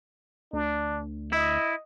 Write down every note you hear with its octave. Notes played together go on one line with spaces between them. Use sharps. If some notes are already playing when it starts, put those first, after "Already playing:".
D2 D4
E4 D#5